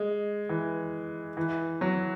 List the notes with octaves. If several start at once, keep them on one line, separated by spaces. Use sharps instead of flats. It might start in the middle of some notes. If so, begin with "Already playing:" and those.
Already playing: G#3
E3
E3
F#3